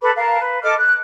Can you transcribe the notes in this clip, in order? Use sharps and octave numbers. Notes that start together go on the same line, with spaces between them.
A4 B4 B5 D6
A#4 F5 A5
B4
A4 D#5 D6 F6
F#6